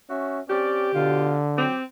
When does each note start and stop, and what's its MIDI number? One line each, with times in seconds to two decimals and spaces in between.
0.10 0.41 61
0.10 0.41 66
0.10 0.41 76
0.50 0.91 60
0.50 0.91 61
0.50 1.44 67
0.50 0.91 74
0.94 1.36 47
0.94 1.65 50
0.94 1.36 65
1.58 1.77 54
1.58 1.84 60
1.58 1.77 67